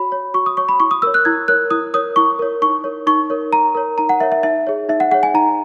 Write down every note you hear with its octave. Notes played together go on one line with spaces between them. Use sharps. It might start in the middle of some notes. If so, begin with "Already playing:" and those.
Already playing: F#4 C#5 B5
C#5
F#4 C#6
D#6
C#5 C#6
B5
E4 C#6
D#6
A#4 C#5 E6
F#6
E4 G#6
A#4 C#5 F#6
E4 D#6
A#4 C#5 D#6
E4 C#6
A#4 C#5
D#4 C#6
A#4 C#5
D#4 C#6
A#4 C#5
D#4 A#5
A#4 C#5
D#4 A#5
F#5
A#4 C#5 E5
E5
D#4 E5
G#4 C#5
D#4 E5
F#5
G#4 C#5 F#5
G#5
D#4 A#5